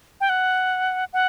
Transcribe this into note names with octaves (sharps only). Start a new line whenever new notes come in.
G5
F#5
F#5